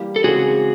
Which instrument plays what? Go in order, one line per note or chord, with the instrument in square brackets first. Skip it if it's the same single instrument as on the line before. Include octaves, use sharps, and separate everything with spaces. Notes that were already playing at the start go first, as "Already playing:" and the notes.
Already playing: [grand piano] E3 G3 A#3
[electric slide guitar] A4
[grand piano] C#3 E3 G#3 C4 [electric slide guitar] F#4 G#4